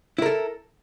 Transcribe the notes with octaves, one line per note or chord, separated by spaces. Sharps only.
E4 A4 A#4